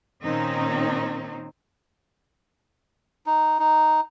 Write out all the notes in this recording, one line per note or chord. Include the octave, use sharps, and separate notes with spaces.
A#2 D#3 C4 C#4 D#4
D#4
D#4